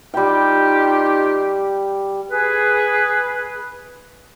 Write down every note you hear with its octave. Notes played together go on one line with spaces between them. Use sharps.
G3 D#4 F4 G4 G5
G#4 B4